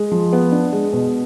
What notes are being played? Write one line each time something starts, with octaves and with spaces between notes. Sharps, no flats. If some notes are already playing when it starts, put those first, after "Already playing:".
Already playing: G#3
F3
B3
D4
G#3
B2